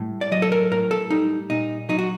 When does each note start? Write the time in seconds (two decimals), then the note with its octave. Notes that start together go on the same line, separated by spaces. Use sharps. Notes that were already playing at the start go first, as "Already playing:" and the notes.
Already playing: A2 G3
0.21 D5
0.32 F#3 D#5
0.42 A4
0.52 A#4
0.72 A2 A#4
0.91 A4
1.10 G3 D#4
1.50 A#2 D#4
1.89 F#3 D#4
1.99 F#4